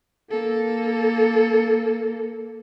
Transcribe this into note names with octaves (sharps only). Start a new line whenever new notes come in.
A#3 A4